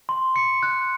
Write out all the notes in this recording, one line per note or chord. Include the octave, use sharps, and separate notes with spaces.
C6
C#7
F#6